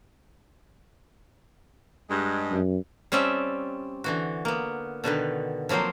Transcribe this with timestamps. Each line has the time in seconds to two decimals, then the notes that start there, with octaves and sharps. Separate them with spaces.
2.10 G2 G#3
2.51 F#2
3.12 G3 C4 C#4 D5 E5 A5
4.04 D3 E3 F#4
4.45 A#3 B3
5.04 B2 D3 D#3 B4
5.69 F3 F#3 A#3 C4 C5